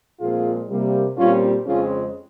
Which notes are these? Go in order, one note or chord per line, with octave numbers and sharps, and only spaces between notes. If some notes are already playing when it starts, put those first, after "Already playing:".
A#2 F3 G#3 C4 F4 G#4
C3 G3 A#3
A#2 G3 C4 C#4 F4
F2 C#3 G#3 C4 C#4 F4